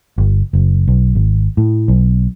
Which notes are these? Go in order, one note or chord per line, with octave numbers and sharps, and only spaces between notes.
G1
F#1
B1
G#1
A2
B1